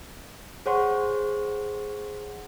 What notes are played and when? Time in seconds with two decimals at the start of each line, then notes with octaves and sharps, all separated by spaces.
0.66 G#4 C5 C#5 F#5 C6 C#6